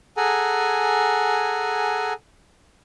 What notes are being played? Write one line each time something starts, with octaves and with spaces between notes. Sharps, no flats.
G#4 A4 F#5 G#5 A#5